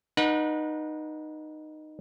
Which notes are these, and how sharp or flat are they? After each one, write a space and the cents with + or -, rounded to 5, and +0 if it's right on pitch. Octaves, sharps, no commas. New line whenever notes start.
D#4 -15 B4 -35 F#5 -20